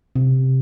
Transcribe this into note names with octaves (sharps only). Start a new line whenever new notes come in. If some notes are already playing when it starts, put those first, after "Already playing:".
C3